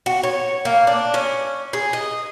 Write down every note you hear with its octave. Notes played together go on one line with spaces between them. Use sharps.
F#4
C#5
A#3
D4
C#4
G#4
D#5